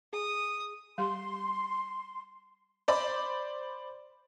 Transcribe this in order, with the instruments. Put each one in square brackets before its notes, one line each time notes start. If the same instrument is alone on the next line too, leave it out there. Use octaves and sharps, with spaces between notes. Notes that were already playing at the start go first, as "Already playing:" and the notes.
[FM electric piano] G#4 [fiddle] D#6
[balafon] G3 G4 [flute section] C6
[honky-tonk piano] C5 D5 B5 D6